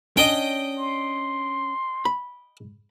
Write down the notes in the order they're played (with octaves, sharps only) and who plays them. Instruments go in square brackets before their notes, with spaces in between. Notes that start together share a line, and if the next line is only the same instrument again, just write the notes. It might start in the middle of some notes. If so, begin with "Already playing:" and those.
[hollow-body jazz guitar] C#4 D4 [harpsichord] D#5 G5
[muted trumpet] C6
[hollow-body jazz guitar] B5